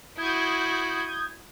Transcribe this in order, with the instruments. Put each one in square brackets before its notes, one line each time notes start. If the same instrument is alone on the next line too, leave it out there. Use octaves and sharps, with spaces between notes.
[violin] E4 F#4 [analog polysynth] D#6 G6 G#6